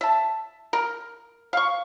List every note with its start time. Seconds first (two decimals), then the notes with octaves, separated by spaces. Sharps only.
0.01 E5 A5
0.73 A#4
1.53 F5 C#6